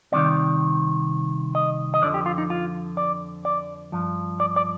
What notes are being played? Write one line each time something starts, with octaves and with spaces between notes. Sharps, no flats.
C2 C3 D#3 D5
D#5
D#5
F2 D3 F3 D5
G4
F4
D#4
F4
D5
D5
G2 F3
D5
D5